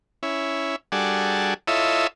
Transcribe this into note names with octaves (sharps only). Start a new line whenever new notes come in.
C#4 E4
G3 D4 F#4 G#4 A4
E4 F4 A4 C#5 D#5 E5